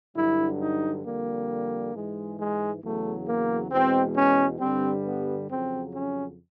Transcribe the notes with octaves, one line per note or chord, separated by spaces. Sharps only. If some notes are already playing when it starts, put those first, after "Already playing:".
G2 D3 F#3 E4
D#4
F2 D3 G3 A#3
G#2 E3 G#3
G#3
E2 C#3 F#3 A3
A#3
E2 B2 G#3 C4
C#4
G2 D3 G3 C4
B3
F2 C#3 F#3 C4
C#4